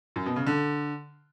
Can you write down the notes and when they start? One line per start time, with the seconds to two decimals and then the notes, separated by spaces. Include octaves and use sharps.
0.16 F#2
0.26 B2
0.36 C#3
0.46 D3